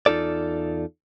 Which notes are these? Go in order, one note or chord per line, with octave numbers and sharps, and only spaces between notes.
E2 D#4 F4 A4 D5